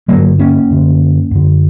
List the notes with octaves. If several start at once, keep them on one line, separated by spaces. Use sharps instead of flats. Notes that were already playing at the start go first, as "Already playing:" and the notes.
G2 D3 F#3 A#3
A#3 C#4
F#2 D3
F#2 D3